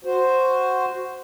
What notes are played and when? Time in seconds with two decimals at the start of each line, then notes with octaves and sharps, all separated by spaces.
0.05 F#4 C5